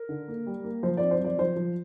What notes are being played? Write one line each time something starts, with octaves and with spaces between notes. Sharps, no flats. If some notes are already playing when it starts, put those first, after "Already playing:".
Already playing: A#4
D3
A#3
G3
A#3
F3 C5
C4 D5
C5
F3 D5
F3 C5
F3